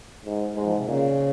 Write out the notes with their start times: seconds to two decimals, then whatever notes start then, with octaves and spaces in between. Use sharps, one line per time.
0.25 G#2
0.55 G#2 G#3
0.65 F3
0.76 C3
0.87 A#2 C#3